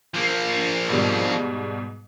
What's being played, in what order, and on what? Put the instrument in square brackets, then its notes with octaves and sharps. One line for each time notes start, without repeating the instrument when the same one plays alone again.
[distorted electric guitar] F3 A#3
[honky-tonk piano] G#2 B2 G3